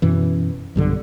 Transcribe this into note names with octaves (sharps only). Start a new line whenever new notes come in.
F#2 B2 E3
B1 G2 D3